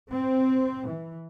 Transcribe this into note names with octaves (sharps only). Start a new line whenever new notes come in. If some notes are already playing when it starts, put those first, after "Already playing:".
C4
E3